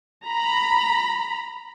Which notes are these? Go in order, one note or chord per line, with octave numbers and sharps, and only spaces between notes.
A#5 B5